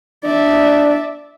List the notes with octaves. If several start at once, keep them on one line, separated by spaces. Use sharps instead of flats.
D4 D5 E5